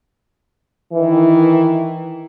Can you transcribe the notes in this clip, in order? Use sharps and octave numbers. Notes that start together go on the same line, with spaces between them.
D#3 E3